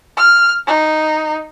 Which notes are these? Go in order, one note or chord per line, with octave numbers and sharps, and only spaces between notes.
F6
D#4